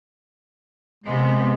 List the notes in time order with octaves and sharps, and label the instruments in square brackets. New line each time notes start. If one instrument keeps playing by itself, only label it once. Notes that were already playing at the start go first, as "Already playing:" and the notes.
[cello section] C3 B3 [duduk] G#3